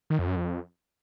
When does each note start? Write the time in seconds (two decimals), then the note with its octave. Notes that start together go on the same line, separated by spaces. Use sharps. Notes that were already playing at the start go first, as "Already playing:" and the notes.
0.10 D#3
0.19 F2
0.28 F#2
0.36 F2